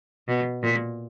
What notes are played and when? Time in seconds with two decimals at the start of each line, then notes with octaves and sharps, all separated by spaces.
0.28 B2
0.63 A#2